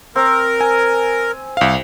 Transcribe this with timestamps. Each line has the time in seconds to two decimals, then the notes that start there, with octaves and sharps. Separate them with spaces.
0.16 C4 A#4
0.61 G#5
1.57 C2 F5